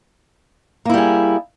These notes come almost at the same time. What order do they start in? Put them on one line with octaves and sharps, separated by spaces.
A#3 E4 G3 G#4